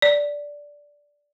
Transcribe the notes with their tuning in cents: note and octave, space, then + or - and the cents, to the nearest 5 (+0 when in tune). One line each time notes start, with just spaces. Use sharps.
D5 -10